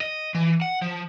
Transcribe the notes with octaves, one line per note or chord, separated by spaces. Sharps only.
D#5
E3
F#5
F3